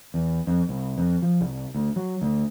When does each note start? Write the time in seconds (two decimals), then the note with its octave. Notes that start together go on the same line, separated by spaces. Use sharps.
0.14 E2
0.47 F2
0.69 C2
0.98 F2
1.22 F3
1.41 C2
1.74 D2
1.96 F#3
2.22 D2